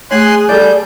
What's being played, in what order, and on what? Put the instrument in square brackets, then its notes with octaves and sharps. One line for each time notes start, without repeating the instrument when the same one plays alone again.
[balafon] A3 C#5 [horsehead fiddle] G#4 [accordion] G#5 C6 F#6
[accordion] G3 G6 [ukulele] A4 D5